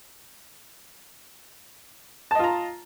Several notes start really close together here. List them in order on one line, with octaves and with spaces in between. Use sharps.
A5 D#5 F4 A#5